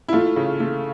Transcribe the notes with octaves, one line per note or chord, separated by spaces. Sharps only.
E4
A3 F4
C#3
A3